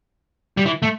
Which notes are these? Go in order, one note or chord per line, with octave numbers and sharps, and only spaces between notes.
G3
E3
A3